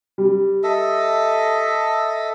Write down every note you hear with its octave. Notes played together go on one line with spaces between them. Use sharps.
G3
A4 D#5 E5